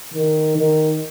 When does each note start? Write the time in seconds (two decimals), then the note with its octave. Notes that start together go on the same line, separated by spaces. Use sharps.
0.14 D#3
0.58 D#3